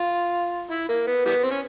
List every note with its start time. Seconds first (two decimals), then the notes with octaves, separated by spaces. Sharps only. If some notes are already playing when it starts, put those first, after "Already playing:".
Already playing: F4
0.71 E4
0.89 A#3
1.07 B3
1.25 E3 G3 B3
1.44 C4
1.51 C#4